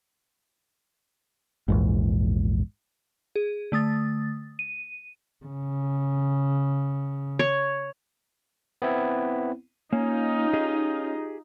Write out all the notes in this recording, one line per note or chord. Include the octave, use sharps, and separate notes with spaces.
A#1 E2 G#2
G#4
D3 A3 D#6 A6
D#7
C#3
C#5
B3 C4 E4
A#3 C#4 D#4 F4
G4 G#4 D#5